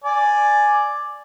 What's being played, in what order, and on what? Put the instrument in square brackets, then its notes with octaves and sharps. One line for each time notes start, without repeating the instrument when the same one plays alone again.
[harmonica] D5 G#5